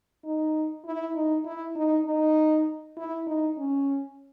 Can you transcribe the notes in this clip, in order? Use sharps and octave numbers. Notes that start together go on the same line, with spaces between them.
D#4
E4
D#4
E4
D#4
D#4
E4
D#4
C#4